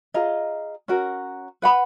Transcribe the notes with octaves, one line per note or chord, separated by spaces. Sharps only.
F4 G#4 D#5 A#5
C#4 F#4 A#4
B4 F#5 B5